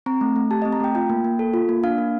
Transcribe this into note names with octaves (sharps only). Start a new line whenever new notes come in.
C4 A#5
A3
A3
G4 A5
D#5
C4
A#5
A3 G5
F4 G5
A#3
A#3
A4
F4
A#3
D4 F5
A#3